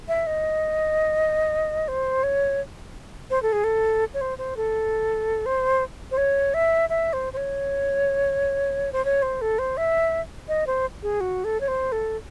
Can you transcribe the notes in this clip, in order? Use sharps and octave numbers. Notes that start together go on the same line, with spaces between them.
E5
D#5
C5
C#5
C5
A4
G#4
A4
C#5
C5
C5
A4
C5
C5
C#5
E5
E5
C5
C5
C#5
C5
C#5
C5
A4
C5
E5
D#5
C5
G#4
F#4
A4
C#5
C5
A4